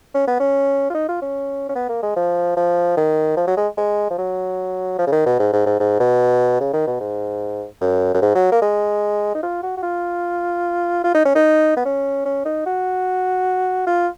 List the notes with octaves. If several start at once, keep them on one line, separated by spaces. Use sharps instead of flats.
C#4
B3
C#4
F4
D#4
F4
C#4
C#4
B3
A#3
G#3
F3
F3
D#3
F3
F#3
G#3
G#3
F3
F#3
F3
C#3
D#3
B2
G#2
G#2
G#2
G#2
B2
C#3
D#3
B2
G#2
F#2
F#2
G#2
F#3
A#3
G#3
D#4
F4
F#4
F#4
F4
F4
D#4
C#4
D#4
B3
C#4
C#4
D#4
F#4
F4